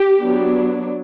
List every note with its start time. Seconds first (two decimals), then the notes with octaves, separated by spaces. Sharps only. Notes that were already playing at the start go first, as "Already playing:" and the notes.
Already playing: G4
0.20 F#3 B3 D4